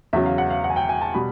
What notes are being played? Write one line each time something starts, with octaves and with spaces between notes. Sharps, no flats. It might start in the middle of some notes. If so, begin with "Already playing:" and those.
E2 C#3 F#3 E5
F5
F#5
F5
F#5
G#5
G5
G#5
A5
B2 G3 B5